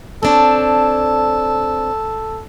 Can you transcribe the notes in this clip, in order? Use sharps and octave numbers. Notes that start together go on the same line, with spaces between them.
C4 D4 A4 C#5